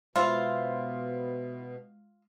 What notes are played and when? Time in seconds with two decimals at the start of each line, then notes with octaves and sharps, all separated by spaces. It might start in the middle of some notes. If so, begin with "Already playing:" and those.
0.16 B2 G#3 E4 F4 C5 F5